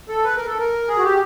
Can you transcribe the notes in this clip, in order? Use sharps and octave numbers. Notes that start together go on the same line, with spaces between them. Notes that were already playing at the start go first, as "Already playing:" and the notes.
A4
B4
A#4
A4
A#4
G#4
F#4
G4